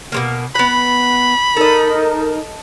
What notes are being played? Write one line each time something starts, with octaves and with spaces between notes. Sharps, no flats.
B2 G#3 A#3
B3 F#5 B5
D#4 A4 A#4 D#5